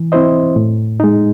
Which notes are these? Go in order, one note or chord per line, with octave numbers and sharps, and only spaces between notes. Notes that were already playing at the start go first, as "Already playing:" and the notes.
Already playing: E3
C4 E4 C5 D#5
A2
G#3 D#4